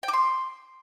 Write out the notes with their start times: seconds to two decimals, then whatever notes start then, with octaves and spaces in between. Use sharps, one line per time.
0.03 G5
0.08 D6
0.13 C6